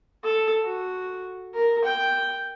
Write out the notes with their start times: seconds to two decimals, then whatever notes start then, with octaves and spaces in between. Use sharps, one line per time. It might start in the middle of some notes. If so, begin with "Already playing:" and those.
0.24 A4
0.64 F#4
1.54 A#4
1.85 G5